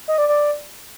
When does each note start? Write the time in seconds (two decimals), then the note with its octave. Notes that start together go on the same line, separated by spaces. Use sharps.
0.08 D#5
0.18 D5
0.28 D5